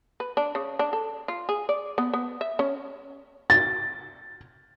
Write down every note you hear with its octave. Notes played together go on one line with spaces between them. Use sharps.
B4
D4
C#3
D4
A4
F4
G#4
D5
B3
B3
E5
C#4
A6